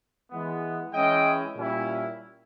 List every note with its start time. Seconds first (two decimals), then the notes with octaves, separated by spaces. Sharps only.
0.31 E3 G#3 B3
0.93 E3 G#3 C#4 E4 D#5 G5
1.55 A#2 G3 C#4 E4